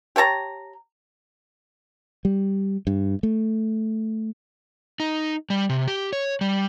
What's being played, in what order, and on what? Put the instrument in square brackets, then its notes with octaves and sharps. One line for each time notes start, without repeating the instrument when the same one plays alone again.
[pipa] G4 C#5 A5 A#5
[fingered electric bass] G3
G2
A3
[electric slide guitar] D#4
G3
C3
G4
C#5
G3